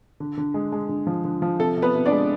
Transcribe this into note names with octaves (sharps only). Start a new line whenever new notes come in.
D3
D3
G#3
G#3
D3
F3
D3
F3
C3 A4
C3
B3 B4
C3
D4 D5
G#3